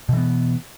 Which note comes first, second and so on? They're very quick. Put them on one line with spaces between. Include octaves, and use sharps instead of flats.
B2 E3 B3